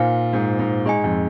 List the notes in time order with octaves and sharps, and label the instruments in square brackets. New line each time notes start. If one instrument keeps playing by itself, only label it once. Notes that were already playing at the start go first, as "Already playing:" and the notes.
Already playing: [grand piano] A#2 [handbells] D#4 C5 F5 G#5
[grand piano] G#2
G#2
[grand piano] G#2 [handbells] G#4 D#5 G#5
[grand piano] F2